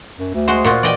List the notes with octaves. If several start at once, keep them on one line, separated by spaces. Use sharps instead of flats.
F#2
D2
G#3 F#4 C5
A#2 F4 F#4
E3 D5 D#5 G5